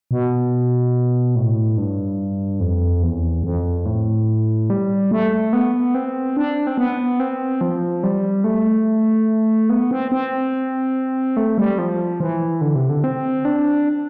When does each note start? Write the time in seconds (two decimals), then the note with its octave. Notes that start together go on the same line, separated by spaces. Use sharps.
0.11 B2
1.36 A2
1.78 G2
2.60 F2
3.02 E2
3.44 F2
3.86 A2
4.70 G3
5.11 A3
5.53 B3
5.94 C4
6.37 D4
6.67 C4
6.78 B3
7.20 C4
7.61 F3
8.03 G3
8.44 A3
9.70 B3
9.91 C4
10.12 C4
11.37 A3
11.58 G3
11.78 F3
12.20 E3
12.61 D3
12.75 C3
12.90 D3
13.04 C4
13.45 D4